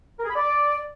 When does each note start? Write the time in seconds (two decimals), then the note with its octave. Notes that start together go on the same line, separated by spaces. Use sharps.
0.20 A#4
0.25 G#4
0.31 B5
0.36 D5